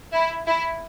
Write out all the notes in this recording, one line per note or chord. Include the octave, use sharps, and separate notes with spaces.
E4
E4